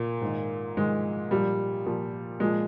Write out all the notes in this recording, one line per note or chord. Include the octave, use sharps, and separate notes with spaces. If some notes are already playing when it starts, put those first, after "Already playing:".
Already playing: A#2 A#3
G#2 D#3
G#2 D#3 G#3
A#2 F3 G3
A#2 F3
A#2 F3 G#3